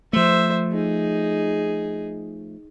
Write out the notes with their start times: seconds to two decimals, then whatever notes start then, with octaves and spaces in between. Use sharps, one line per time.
0.13 F3 A3 C5 E5
0.72 D#4 G#4